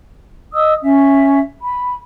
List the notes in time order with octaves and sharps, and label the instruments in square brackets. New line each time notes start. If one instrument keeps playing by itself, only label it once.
[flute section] D#5 D#6 E6
C#4 E5
B5